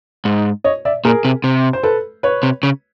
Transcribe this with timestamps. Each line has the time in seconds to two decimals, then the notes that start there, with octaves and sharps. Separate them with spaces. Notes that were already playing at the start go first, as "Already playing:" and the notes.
0.25 G#2
0.64 C#5 D#5
0.85 D5 E5
1.05 A#2 G#4 A#4
1.25 C3
1.44 C3
1.73 C5
1.83 A4 B4
2.23 B4 C#5
2.43 C3
2.63 C#3